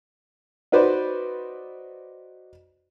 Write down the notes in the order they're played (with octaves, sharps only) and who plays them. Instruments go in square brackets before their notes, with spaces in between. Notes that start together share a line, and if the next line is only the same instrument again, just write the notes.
[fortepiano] D#4 F#4 B4 C5 D5